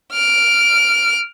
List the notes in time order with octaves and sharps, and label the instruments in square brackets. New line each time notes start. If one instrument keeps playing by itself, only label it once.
[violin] F6 D7